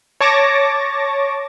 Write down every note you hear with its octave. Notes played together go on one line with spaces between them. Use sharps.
C#5 A5 C#6 D6 A6 A#6